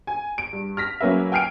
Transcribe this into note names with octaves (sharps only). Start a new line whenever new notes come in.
G#5
D7
G2
F6 A#6 B6
F#3 A#3 C#4 B4 E5
G5 G#5 F6 C7 D7